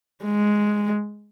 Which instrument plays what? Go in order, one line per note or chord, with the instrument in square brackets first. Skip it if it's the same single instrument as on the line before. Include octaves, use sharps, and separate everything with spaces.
[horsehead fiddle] G#3